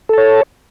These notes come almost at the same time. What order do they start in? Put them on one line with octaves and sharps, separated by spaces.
A4 A5 C#5